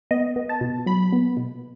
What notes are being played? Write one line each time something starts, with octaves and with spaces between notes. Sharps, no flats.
B3 D#5
B3
A5
B2
F#3 B5
B3
B2